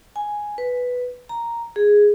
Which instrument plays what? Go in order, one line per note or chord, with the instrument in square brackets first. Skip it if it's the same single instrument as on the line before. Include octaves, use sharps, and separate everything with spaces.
[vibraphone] G#5
B4
A#5
G#4